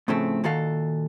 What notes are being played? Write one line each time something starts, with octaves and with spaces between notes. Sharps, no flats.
A2 C#3 F3 A3 C4
A#2 D#3 F#4 A4 F5